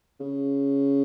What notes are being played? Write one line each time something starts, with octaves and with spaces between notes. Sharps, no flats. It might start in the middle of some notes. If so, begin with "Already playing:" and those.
C#3